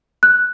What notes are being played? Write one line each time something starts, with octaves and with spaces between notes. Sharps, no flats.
F#6